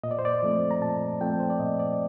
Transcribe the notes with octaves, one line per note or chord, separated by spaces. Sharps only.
A#2 D#5
D5
C5
D5
F3 A3 C4
A#5
A#2 A5
F3 A3 C4 G5
C5
D5
A#2 D#5
D5